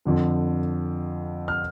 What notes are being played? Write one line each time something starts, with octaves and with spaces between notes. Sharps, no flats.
F2 D3 F3
F6